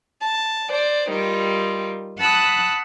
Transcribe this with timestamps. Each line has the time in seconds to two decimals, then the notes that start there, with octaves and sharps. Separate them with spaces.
0.19 A5
0.69 C5 D5
1.09 D#3 G3 F4
2.18 F#5 A5 B5 D#6 E6 F#6